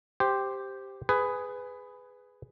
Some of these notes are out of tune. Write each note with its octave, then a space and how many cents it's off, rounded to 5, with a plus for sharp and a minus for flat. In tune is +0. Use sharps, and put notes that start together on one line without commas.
G4 +0 C5 +0
G#4 +0 B4 +15